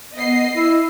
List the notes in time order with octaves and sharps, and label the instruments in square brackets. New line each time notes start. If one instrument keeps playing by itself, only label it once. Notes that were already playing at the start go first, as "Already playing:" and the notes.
[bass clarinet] B3 [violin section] D#5 C7
[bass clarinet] E4